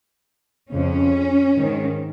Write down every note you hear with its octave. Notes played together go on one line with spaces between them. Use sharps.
F2 C#3 C#4
G#2 D#3